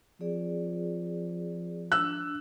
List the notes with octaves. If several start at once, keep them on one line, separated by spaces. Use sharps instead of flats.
F3 C4 G#4 D5
D4 E6 F#6